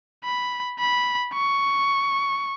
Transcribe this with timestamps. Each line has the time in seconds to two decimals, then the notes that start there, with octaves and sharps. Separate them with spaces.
0.24 B5
0.79 B5
1.34 C#6